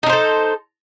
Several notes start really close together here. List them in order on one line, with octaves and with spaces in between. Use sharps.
D#4 D4 C5 A4